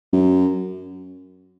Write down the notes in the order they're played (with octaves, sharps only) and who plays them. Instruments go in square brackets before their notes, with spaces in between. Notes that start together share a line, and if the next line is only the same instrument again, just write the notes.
[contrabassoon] F#2